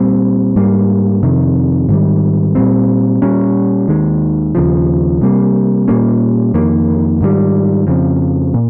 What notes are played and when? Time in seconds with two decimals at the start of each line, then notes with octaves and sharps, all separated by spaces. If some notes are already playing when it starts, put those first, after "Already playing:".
Already playing: A#2 G3 C4
0.56 G#2 G3 A#3
1.23 F2 C3 D#3
1.89 G#2 D#3 G3
2.55 A#2 G3 C4
3.22 A#2 G3 C#4
3.88 D#2 D#3 G#3
4.55 D#2 C#3 F3
5.21 C3 G3 A#3
5.88 A#2 G3 A#3 C#4
6.54 F2 D#3 A#3
7.21 G#2 D#3 G3
7.87 F2 C#3 F3
8.54 A#2